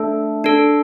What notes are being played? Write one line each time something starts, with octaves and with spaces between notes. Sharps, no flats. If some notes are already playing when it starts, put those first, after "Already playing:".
Already playing: A3 D4 A4
D4 A4